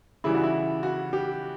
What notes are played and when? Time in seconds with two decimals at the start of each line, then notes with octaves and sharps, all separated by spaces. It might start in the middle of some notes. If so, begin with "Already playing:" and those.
0.24 C#3 E3 G3 E4
0.34 F#4
0.43 E4
0.83 F#4
1.13 G4